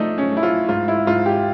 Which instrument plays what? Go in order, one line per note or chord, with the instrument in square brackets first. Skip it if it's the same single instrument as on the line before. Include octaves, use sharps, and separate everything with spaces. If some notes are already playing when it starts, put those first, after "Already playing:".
Already playing: [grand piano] F3 A3 [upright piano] D4 D#4
[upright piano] C#4
[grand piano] A3
[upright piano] E4
F4
[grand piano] G#2 [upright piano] F4
[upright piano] E4
[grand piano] G#2 [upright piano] F4
[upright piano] G4